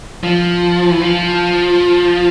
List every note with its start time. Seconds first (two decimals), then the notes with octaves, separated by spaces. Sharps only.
0.24 F3
0.91 E3
1.01 F3